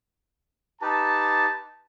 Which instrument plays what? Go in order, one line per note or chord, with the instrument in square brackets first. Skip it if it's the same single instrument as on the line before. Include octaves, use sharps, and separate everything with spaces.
[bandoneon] D#4 G4 B4 [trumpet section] A5